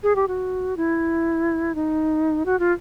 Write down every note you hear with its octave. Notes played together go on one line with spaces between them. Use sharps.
G#4
G4
F#4
E4
D#4
F#4
F4